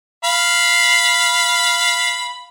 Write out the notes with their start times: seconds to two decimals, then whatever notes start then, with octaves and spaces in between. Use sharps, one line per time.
0.24 F5 B5